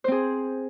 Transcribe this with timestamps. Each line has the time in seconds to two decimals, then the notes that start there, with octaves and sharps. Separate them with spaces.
0.04 C5
0.08 C4
0.12 G#4